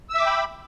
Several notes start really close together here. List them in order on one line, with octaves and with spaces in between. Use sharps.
E6 E5 D6 G5 B5